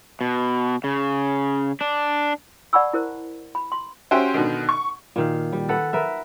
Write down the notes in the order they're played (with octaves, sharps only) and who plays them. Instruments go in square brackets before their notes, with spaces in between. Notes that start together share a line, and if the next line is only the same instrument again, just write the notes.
[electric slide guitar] B2
C#3
D4
[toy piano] D5 F#5 A5 B5 C#6 E6
E4 A#4 C5
B5
C6
[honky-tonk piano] C#4 F#4 G4 C5 E5 G5
B2 D3 D#3
C#6
[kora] A#2 D#3 F5
G3
A4 B4 F#5
A#4 B4 E5